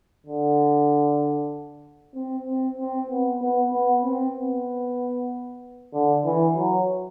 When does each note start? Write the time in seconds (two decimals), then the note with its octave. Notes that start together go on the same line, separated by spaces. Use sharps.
0.26 D3
2.15 C4
2.46 C4
2.78 C4
3.10 B3
3.41 B3
3.73 B3
4.05 C4
4.36 B3
5.94 D3
6.25 E3
6.57 F#3